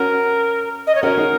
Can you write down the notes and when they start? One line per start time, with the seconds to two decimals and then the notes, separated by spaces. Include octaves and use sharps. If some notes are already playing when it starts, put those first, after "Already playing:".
Already playing: C#4 F#4 A#4
0.87 D#5
0.95 C#5
1.03 C#4 F#4 A#4
1.18 D#4 G#4